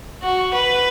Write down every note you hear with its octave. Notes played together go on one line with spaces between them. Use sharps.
F#4
B4